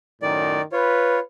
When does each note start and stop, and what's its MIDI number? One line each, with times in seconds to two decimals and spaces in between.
0.22 0.59 42
0.22 0.59 45
0.22 0.59 51
0.22 0.62 74
0.72 1.19 65
0.72 1.19 71
0.72 1.19 73